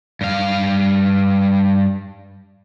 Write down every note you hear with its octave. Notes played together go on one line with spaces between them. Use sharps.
G2 F5